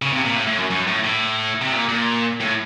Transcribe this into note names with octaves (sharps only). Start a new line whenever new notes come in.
C#3
C3
A#2
A2
A2
F#2
F#2
A2
A2
C3
A#2
A#2
A2